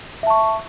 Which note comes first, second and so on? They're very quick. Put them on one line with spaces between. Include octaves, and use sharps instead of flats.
E5 A5 C#6